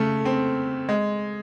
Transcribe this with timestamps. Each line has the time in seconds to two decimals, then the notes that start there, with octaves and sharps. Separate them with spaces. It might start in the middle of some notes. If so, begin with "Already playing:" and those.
Already playing: C#3 A3
0.25 C4
0.89 G#3